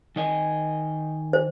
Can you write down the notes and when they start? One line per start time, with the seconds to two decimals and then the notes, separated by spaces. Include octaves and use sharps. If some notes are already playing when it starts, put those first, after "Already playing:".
0.16 D#3 D#5 G#5
1.33 C5